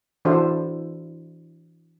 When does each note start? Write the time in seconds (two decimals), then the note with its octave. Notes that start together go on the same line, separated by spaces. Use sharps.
0.25 E3 D4 E4 F#4 A4 C5